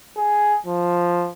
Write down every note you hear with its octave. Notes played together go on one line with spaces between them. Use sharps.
G#4
F3